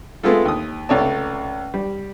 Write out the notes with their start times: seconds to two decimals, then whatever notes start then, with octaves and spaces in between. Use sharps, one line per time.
0.23 G#3 A3 B3 C4 F4 A4
0.45 D#2 D#6
0.89 C#2 C3 A3 C#5 D5 A5
1.74 G3